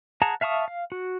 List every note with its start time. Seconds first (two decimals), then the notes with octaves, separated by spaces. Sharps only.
0.22 G#4 F#5 A5 A#5
0.41 E5 F5 A5 C#6 D#6
0.68 F5
0.92 F#4